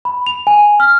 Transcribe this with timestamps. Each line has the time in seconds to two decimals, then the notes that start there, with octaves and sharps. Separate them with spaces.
0.05 B5
0.26 F7
0.47 G#5
0.80 F6